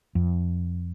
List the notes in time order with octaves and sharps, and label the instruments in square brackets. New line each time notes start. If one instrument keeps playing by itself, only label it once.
[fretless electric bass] F2